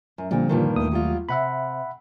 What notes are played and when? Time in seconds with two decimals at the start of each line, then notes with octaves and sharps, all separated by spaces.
0.18 F#2
0.31 A#2 D3 F3 G3 C4
0.49 G2 A#2 D#3
0.76 D#2 A3 D#6
0.91 F#3 G3 F4
1.29 C3 E5 F#5 B5